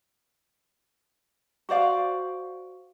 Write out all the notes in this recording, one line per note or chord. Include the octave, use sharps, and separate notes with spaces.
F#4 C5 D5 F5